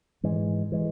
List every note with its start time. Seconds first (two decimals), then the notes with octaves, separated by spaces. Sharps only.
0.23 G#2 E3 G#3
0.72 E3 G#3